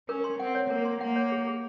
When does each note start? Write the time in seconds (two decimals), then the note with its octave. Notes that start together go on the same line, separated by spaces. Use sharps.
0.08 C#4 A#4
0.24 C6
0.39 C4 F#5
0.55 C#5
0.70 A#3 A#4
0.85 C6
1.01 A#3 F#5
1.16 C#5
1.32 G#4
1.47 G#4